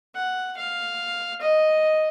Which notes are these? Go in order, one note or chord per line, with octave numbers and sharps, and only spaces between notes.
F#5
F5
D#5